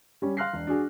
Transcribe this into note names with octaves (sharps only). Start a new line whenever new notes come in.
G3 C#4
F5 C6 F6 F#6 A#6 C7
E1
D4 F#4 G#4